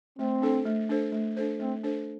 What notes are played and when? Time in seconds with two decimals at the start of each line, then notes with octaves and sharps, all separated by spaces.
0.19 A3 C4
0.42 D4 A4 C5
0.65 A3
0.89 D4 A4 C5
1.12 A3
1.37 D4 A4 C5
1.59 A3 C4
1.83 D4 A4 C5